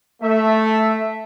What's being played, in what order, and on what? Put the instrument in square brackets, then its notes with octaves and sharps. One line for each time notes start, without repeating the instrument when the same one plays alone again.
[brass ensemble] A3 [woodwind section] E5